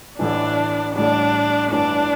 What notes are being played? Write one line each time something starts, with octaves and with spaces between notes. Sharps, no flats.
A1 A2 E3 D4
A1 A2 G3 D4
A1 G2 E3 D4